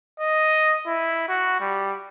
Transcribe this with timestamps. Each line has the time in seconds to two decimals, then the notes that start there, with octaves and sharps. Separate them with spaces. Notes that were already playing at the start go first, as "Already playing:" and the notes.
0.20 D#5
0.87 E4
1.29 F#4
1.61 G3